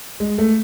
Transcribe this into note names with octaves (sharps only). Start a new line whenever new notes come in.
G#3
A3